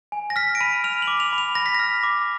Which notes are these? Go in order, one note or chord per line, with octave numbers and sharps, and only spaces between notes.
G#5
A#6
F6 B6
D7
B5 D#7
F6 F7
F#7
D6
F7
B5
F7
B5 A#6
B6
F6 A#6
D6